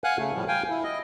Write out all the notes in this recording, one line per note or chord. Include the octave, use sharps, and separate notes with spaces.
F5 F#5 G#5 F#6
C#3 A3
A2 F3 G3
F5 G5 G#5
E4
D#5